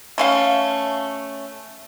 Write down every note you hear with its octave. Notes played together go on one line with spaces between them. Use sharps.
A3 C#4 F5